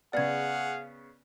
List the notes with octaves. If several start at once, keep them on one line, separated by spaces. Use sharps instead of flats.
C#3 B3 G#4 D5 F5 F#5 G#6